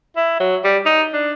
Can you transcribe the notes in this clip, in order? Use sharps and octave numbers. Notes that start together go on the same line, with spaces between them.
E4
F#3
G3
D#4
D4